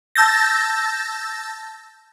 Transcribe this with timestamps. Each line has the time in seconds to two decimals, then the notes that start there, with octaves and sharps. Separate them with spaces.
0.15 A5 E6 G6 A6 A#6